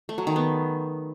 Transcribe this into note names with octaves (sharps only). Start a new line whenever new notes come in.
A3
F#3
D#3
B3